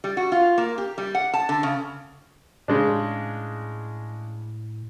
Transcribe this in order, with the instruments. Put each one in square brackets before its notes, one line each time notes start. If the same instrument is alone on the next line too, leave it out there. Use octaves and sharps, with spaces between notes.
[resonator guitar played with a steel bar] G3
F#4
F4
A#3
G4
G3
F#5
A5
D3
C#3
[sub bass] A2 [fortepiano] C#3 G#3 D4